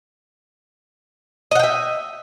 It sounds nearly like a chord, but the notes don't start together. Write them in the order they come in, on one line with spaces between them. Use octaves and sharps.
D#5 F#5 G5 E5